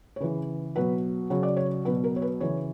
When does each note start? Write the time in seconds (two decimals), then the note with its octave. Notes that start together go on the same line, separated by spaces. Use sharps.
0.16 C#5
0.20 C#3 E3 B4
0.76 B2 F#3 B4
1.30 C#3 F#3 C#5
1.43 D5
1.57 C#5
1.85 F#3 B4
1.88 B2
2.04 A#4
2.16 C#5
2.22 B4
2.40 C#3 E3 C#5